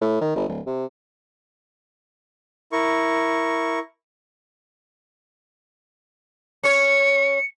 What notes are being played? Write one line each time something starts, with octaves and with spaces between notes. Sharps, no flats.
A2
D#3
G1
D1
C3
E4 A#4 C#6
C#4 C#5 C#7